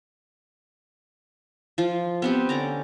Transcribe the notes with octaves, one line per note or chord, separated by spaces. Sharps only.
F3 F4
B3 C4 G4
D3 C#4 A#5 D6